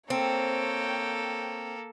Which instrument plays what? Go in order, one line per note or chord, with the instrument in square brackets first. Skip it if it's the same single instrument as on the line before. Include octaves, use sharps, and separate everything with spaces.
[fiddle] A#3 A4 [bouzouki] C4 [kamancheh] C#5 G5